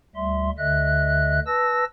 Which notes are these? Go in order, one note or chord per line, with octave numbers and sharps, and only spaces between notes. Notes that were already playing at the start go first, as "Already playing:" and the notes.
D2 G3 E5 C6
D2 D3 D#5 E5 F#6
B4 A5 E6 A#6